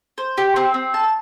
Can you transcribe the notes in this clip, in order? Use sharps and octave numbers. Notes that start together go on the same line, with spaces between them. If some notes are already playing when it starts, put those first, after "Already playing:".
C5
G4
C4
C4
A5